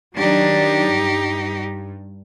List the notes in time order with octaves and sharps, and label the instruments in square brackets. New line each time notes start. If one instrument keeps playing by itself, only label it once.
[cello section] D#3 F#3 D4 [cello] D#4 G4
[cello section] G2